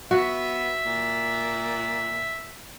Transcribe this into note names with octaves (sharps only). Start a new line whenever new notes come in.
B3 F#4 E5
A#2